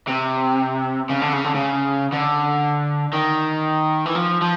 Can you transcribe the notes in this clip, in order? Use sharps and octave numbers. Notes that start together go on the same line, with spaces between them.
C3
C#3
D3
C#3
D3
C#3
D3
D#3
E3
F3
F3